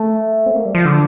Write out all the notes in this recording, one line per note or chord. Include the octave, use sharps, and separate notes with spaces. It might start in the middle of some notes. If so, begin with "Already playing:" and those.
Already playing: A3
C4
A3
A#3
G3
F3
D3